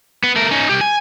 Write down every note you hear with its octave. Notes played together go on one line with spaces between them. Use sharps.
B3
A3 A#4
C#4 D#4
C2 G4
G#5